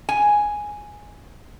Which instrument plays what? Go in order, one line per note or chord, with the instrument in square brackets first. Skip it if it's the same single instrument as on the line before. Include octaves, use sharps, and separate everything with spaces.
[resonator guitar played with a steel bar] G#5